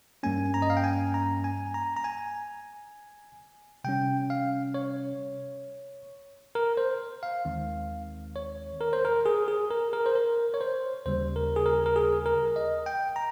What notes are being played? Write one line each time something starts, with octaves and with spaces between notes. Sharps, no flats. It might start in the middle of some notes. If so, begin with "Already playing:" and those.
G2 G3 A#3 C#4 G#5
A#5
D#5
F5
G5
G#5
A#5
G#5
A#5
A#5
G#5
C3 G3 C#4 G5
F5
C#5
A#4
C5
F5
D#2 D#3 G#3 C4
C#5
A#4
C5
A#4
G#4
G#4
A#4
A#4
C5
A#4
C#5
C5
D#2 C#3 G3 A#3 C5
A#4
G#4
A#4
A#4
G#4
A#4
D#5
G5
A#5